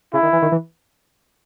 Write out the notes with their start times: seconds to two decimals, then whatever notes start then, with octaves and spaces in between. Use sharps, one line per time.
0.13 C#3 E4
0.23 D#3
0.33 E3
0.42 D#3
0.52 E3